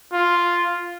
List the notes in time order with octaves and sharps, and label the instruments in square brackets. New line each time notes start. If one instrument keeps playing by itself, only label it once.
[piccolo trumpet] F4